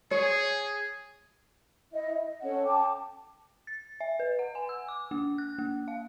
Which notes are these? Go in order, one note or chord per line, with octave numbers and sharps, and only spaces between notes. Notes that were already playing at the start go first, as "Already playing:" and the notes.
G#4 C#5
E4 D#5 E5
D#5
C#4 A4 C#5 F#5
G5 A5 D6
A6
E5
B4
F#5
G#5
E6
D6
A#3
F#6
A#3
F5